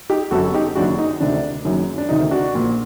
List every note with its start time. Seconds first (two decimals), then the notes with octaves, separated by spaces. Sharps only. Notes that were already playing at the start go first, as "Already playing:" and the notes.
0.10 D#4 G4
0.31 G1 F#2 D3 F#4 A4
0.54 D#4 G4
0.75 F#1 F#2 D#3 D4 F#4
0.99 D#4
1.20 D2 C3 D#3 D4
1.65 F#1 F#2 D#3
1.98 D4
2.09 D2 C3 D#3 D#4
2.31 D4 F#4
2.54 A#1 A#2